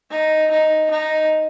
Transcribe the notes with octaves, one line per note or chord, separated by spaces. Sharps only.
D#4
D#4
D#4